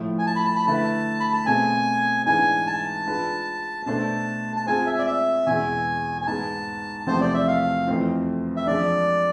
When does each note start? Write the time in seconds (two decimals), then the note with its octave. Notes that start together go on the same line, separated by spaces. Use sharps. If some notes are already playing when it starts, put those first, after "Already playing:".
Already playing: A2 F3 A3 E4
0.19 G#5
0.27 A5
0.36 B5
0.45 A5
0.55 B5
0.67 D3 A3 E4 B4 A5
1.20 B5
1.33 A5
1.46 B2 A3 C4 G#4 C5 G#5
2.26 G#2 E3 G#3 D4 G#5
2.67 A5
3.06 G#3 D4 F4 B4
3.86 B2 A3 D4 A4 C5 A5
4.56 A5
4.66 G#3 C4 F4 G#4 C5 G#5
4.87 E5
4.98 D5
5.06 E5
5.47 E2 B2 G#3 G#5
6.22 G#5
6.27 G#2 G#3 B3 A5
7.06 E2 C3 F3 A3 C4 C5
7.21 D5
7.34 E5
7.47 F5
7.87 F2 E3 A3 C4 F4
8.57 E5
8.67 F3 G#3 D4 D5